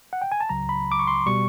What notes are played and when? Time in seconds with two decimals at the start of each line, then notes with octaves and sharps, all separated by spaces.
0.13 F#5
0.22 G5
0.32 G#5
0.40 A5
0.49 C#2 C#3 F#3 A#5
0.69 B5
0.92 D6
0.99 C#6
1.07 C6
1.26 B2 G3 C#6